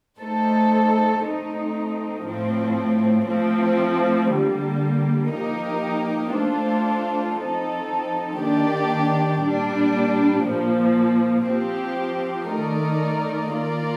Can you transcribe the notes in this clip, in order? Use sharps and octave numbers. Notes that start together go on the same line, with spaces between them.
A3 D#4 A4 C5
A3 C4 D#4
A2 F3 C4
F3 A3 C4
D3 G3 A#3
F3 A#3 D#4 G4 A#4
A3 D4 F4 A4 C5
F3 C4 D#4 A4
D#3 A#3 D4 G4 D5
A#2 G3 D4
A#2 F3 A#3
F3 C4 G4
D#3 A3 D#4 A#4 D5
D#3 A#3 F4 A#4 D5